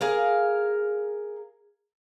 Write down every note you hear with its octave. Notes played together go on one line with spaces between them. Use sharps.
G#4 A#4 F5